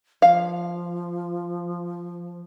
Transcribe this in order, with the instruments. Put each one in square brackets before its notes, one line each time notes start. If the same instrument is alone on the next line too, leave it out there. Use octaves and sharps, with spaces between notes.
[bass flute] F3 [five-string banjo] F5